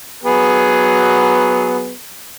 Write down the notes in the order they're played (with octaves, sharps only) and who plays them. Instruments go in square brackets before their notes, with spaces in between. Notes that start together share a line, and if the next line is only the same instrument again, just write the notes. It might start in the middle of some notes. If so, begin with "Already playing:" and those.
[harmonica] F#3 B3 G#4